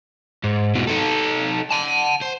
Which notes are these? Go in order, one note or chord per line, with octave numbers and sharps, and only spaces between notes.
G#2
G#2 B2
D#4 A4
F#5 A5
C5